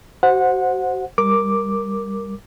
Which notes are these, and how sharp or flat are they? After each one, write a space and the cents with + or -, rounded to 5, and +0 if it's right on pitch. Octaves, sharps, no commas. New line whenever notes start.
F#4 +35 C5 +0 F#5 -20
G3 +15 A#4 +0 D6 +0